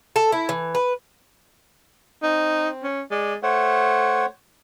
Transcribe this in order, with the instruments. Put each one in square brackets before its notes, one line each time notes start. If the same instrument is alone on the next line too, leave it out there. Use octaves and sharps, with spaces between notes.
[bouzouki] A4
E4
E3
B4
[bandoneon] C4 [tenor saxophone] D#4
[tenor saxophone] C#4
[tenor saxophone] G#3 [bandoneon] D5
[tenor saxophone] A3 [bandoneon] C5 C#5 F#5